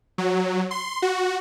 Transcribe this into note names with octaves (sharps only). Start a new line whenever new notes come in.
F#3
C6
F#4